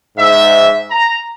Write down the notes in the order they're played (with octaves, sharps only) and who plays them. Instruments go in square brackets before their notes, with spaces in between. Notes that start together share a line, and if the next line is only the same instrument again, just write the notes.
[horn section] G#2 E5
A#5